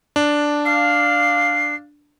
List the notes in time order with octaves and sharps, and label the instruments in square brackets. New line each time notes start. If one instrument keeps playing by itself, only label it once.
[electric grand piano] D4
[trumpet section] D5 F5 [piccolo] C7